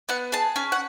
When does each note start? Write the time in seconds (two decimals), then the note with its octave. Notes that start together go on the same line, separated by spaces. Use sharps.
0.09 B3 F#5
0.32 G#4 A5
0.56 C#4 G#5
0.72 F#5